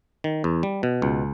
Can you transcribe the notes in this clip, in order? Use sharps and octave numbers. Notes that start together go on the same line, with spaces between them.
D#3
E2
G3
B2
C#2